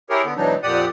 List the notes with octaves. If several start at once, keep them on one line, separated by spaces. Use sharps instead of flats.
E4 G4 G#4 A#4 C#5
D3 B3
G#2 B2 E3 F#3 D4 D#4
F2 A#2 G4 D5 F#5 D#6